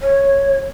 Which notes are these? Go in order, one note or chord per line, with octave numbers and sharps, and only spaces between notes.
C#5